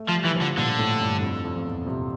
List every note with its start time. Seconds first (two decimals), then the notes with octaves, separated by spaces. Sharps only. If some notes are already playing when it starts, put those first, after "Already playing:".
Already playing: A3
0.09 F3
0.15 G3
0.25 E3
0.36 F3
0.41 D3
0.58 A#2 D3
0.79 A2
1.01 G2
1.22 F2
1.44 F2
1.56 F2
1.65 E2
1.82 A#2
1.87 C3